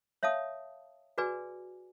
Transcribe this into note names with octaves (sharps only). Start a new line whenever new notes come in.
C#5 E5 F5 A5 D#6
F#4 G#4 B4 D5 G#5